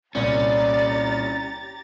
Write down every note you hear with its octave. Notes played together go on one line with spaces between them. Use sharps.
C2 A#2 C#4 G4 D5 A#5 A6